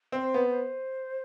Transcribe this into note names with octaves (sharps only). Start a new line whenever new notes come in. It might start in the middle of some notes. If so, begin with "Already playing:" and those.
C4
C5
B3
C5